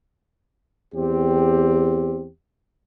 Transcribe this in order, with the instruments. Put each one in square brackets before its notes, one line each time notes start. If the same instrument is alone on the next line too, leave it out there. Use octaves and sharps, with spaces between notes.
[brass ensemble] E2 C4 G4